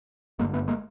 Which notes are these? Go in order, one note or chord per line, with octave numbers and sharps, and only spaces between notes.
G#1 G2 D3 G#3 A#3
A3 B3
G#3 A#3